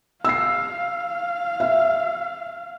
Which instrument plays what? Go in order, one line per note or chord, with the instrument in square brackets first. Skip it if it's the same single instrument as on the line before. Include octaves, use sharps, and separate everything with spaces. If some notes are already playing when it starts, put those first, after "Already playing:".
[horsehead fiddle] F5 [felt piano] E6 C7
[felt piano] E5